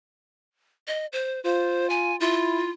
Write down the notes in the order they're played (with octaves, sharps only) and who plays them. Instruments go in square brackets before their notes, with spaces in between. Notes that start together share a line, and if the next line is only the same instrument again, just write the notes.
[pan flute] D#5
C5
[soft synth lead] F4 [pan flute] C5
[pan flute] G#5
[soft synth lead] E4 [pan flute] F4